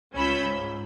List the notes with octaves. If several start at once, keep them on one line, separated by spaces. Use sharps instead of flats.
C#2 C#4 F4 B5 E6 G6
G#2